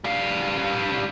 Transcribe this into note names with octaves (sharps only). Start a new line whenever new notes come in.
G3 F5